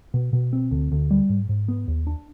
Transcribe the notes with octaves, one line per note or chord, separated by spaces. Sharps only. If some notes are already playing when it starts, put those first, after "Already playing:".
B2
B2
C4
D2
D2
G3
G#2
G#2
B3
D#2
D4